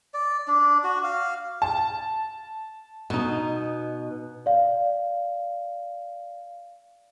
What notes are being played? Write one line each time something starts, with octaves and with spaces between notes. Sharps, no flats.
D5
D4
F#4
F5
A5
B2 D#4
D5 F5